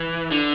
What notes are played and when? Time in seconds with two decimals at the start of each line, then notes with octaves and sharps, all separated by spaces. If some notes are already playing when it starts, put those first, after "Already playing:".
Already playing: E3
0.31 D3